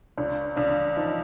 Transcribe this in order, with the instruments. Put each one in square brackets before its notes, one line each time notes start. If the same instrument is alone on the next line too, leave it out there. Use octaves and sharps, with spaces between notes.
[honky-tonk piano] C#2 [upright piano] D4
[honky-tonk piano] C#2 [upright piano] D4
[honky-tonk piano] F3 [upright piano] D#4